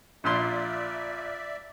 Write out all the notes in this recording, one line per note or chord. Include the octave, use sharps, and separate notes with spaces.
A#1 A#2 D5 E5 C6